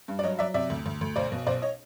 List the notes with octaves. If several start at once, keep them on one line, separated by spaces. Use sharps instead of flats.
G2
D5
F#3 C#5 D#5
F#3 D5 E5
C3 D5 E5
D2
D2
D2
B1 C5 D5
B2
B1 C5 D5
C#5 D#5